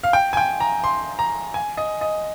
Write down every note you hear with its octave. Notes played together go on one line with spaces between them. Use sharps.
F5
G5
G#5
G5
A#5
C6
A#5
G#5
D#5
D#5